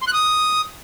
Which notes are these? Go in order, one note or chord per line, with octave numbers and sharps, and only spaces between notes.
C6
F#6
D#6